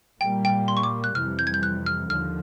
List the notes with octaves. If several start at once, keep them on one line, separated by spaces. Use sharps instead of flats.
A#2 G3 A#3 G5
G5
C6
C#6
D6
F#6
F2 C3 E3 G3 F6
G6
G#6
G6
F#6
F6
D#2 D3 F3 F6